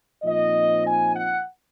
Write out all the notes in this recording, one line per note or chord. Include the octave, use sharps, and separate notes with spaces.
A#2 F3 C4 D#4 D#5
G#5
F#5